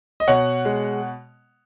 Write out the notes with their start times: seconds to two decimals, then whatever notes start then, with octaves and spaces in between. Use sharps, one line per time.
0.20 D#5
0.28 B2 C#5 F#5
0.65 G#3